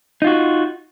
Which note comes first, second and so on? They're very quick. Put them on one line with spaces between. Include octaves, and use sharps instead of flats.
D#4 F4 F#4